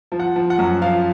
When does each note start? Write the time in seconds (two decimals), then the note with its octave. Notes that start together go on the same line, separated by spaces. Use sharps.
0.12 F3
0.20 F#5
0.36 F3
0.50 F#5
0.58 F#2
0.82 F3 F5